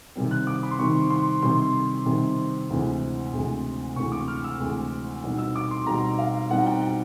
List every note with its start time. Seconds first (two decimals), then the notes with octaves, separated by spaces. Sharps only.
0.16 C3 D#3 G3 C4
0.31 F#6
0.47 D6
0.63 B5
0.71 C6
0.78 C3 D#3 G3 C4 C#6
1.10 C6
1.42 C3 D#3 G3 C4 C6
2.06 C3 D#3 G3 C4
2.69 D2 C3 E3 G#3 C4
3.33 D2 C3 E3 G#3 C4
3.96 D2 C3 E3 G#3 C4 C#6
4.12 D6
4.28 F6
4.44 E6
4.59 D2 C3 E3 G#3 C4
5.24 B2 G3 C4 D#4
5.38 E6
5.55 D6
5.71 C6
5.86 B2 G3 C4 D#4 A#5
6.19 F5
6.50 B2 G3 C4 D#4 F#5
6.66 G5
6.81 G5